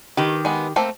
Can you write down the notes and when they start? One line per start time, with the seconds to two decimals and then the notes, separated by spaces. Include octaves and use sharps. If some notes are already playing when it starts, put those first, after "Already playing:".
0.17 D#3 G4 B4
0.45 G#3 B3
0.76 A3 A#3 C4